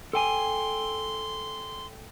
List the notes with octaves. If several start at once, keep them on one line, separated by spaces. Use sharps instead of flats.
A4 G5 G#5 C6